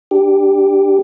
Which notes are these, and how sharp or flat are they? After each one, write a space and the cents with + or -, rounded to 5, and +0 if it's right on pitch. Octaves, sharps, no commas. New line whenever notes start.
D4 +0 G4 +0